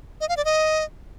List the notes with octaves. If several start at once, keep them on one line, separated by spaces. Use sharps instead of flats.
D#5
F5
D5
D#5